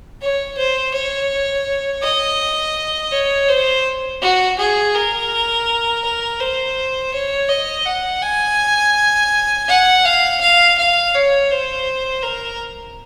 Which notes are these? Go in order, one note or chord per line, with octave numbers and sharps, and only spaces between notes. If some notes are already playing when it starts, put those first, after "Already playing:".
C#5
C5
C#5
D#5
C#5
C5
F#4
G#4
A#4
A#4
C5
C#5
D#5
F#5
G#5
F#5
F5
F5
F5
C#5
C5
A#4